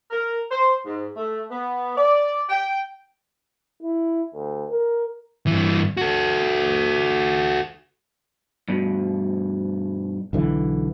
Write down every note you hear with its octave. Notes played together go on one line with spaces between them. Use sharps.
A#4
C5
G#2
A3
B3
D5
G5
E4
D2
A#4
G2 E3
F#4 A4
G2 B2
B1 D3 E3